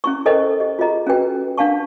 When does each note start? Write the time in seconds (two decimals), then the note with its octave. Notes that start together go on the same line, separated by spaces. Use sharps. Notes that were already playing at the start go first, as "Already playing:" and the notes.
0.04 C#4 E4 C#6
0.26 E4 A4 A#4 C5 D#5 G5
0.60 G4 D#5
0.79 F4 G#4 D#5 A#5
1.07 C#4 F4 F#4 A4 B4 G5
1.58 D4 F5 F#5 A5 C#6